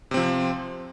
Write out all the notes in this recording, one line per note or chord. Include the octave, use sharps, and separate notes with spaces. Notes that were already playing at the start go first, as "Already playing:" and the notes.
C3 F3 C4